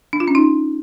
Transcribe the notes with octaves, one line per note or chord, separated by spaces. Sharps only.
D4
F4
C#4
D#4